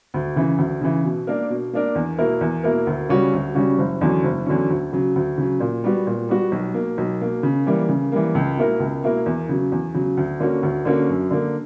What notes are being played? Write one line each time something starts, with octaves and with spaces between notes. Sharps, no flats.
D2
C#3 E3
D2
C#3 E3
B2
A#3 D4 A#4
B2
A#3 D4 A#4
E2
B2 A#3 E4 A#4
E2
B2 A#3 E4 A#4
D2
C#3 G3 C#4 F#4
D2
C#3 G3 C#4 F#4
F#1
E2 D3 F#3 C#4
F#1
E2 D3 F#3 C#4
D2
C#3 F#3
D2
C#3 F#3
A#2
G3 B3 F#4
A#2
G3 B3 F#4
B1
B2 A#3
B1
B2 A#3
C#3
E3 G3 A#3
C#3
E3 G3 A#3
C#2
B2 A#3 E4 A#4
C#2
B2 A#3 E4 A#4
E2
C#3 F#3
E2
C#3 F#3
D2
D3 A#3 C#4 F#4
D2
D3 A#3 C#4 F#4
F#2
D3 A#3